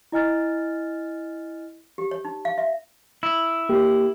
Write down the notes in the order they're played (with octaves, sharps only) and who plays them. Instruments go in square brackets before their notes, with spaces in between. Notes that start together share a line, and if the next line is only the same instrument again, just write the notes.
[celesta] E4 D#5 G#5 F6 A6
[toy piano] G4
C#5
D#4
F5
E5
[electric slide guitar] E4
[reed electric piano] A#3 G4